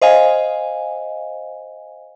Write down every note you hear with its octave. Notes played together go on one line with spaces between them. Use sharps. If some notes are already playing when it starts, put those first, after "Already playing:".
C5 D#5 F5 G#5